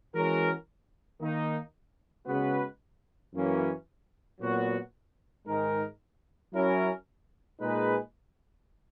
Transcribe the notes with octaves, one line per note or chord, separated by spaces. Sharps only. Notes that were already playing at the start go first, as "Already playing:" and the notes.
E3 G#3 C#4 F#4 A#4
D#3 A#3 D#4
C#3 G#3 B3 F#4 B4
F#2 E3 A#3 C#4
A#2 F#3 B3 F#4
G#2 D#3 G#3 D#4 A#4
F#3 C#4 E4 A#4
A#2 G#3 D#4 G#4 B4